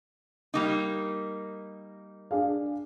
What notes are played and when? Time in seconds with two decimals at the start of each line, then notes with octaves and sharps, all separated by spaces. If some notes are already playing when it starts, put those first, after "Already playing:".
0.54 G3 A#3 D#4
2.31 D4 G#4 F5